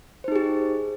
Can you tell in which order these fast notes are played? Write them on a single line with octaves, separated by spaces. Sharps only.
C5 D#4 G#4 G4